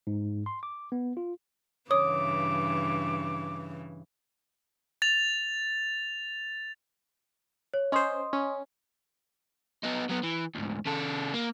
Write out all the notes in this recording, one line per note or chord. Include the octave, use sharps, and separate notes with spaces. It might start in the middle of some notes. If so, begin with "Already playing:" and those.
G#2
C6
D6
B3
F4
G2 C#3 E3 C#5 D6 D#6
A6 F7
C#5
C#4 C5 D#5 C6 D#6
C#4
B3 D#4
F#3 B3
E3
D2 G#2
C#3 A4
A#3